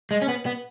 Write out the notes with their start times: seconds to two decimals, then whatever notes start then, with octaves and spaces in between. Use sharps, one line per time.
0.11 G#3
0.22 C#4
0.29 B3
0.46 B3